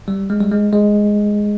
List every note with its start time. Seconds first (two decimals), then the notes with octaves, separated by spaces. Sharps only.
0.08 G3
0.30 G#3
0.40 G3
0.52 G#3
0.73 G#3